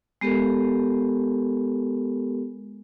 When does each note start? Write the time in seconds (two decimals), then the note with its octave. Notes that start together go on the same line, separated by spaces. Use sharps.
0.21 G#3 B3 G4 A4 A#4